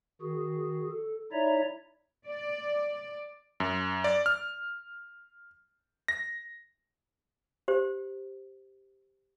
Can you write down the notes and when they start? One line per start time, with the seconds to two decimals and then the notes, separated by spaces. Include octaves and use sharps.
0.22 D#3 F#4 G#4
0.91 A4
1.32 D#4 E4 C#5 D5 E5 A#5
2.26 D5
3.60 F#2
4.04 D5
4.26 F6
6.08 A#6
7.68 G4 C5